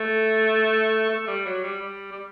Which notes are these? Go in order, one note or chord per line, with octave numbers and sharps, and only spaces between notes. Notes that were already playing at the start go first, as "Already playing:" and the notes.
Already playing: A3
A3
G3
F#3
G3
G3
G3